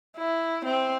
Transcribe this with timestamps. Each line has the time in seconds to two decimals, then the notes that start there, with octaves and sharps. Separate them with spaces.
0.17 E4
0.65 C4